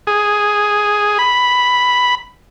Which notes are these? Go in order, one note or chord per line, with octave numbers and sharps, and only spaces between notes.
G#4
B5